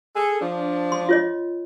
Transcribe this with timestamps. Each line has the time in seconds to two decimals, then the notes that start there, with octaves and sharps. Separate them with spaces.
0.15 G#4 A4
0.41 F3 D4
0.92 C6
1.09 F4 C#5 D#5